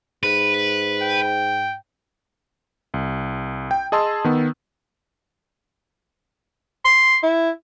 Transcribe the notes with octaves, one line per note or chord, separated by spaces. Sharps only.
G#2 B4
G5
C2
G5
G#4 D#5 A5 C6 E6
D#3 B3
C6
E4